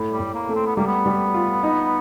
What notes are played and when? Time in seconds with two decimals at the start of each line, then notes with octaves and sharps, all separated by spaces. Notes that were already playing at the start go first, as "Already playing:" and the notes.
Already playing: A2
0.12 G3
0.20 A2
0.34 A#3
0.49 A3
0.55 C4
0.66 B3
0.76 G3 A#3
0.87 B3
1.06 G3
1.34 F4
1.63 D#4